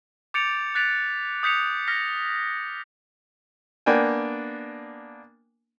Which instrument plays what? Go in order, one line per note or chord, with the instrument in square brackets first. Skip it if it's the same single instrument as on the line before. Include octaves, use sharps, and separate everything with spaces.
[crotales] D6 G6 A6 C#7 D7 F7
F#6 A6 B6 D7 F7
D#6 G6 B6 C#7 F7
F6 A#6 B6
[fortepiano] A#3 B3 D4 G5 G#5